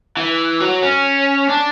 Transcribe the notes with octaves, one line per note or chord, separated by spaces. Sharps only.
E3
F#3
C#4
D4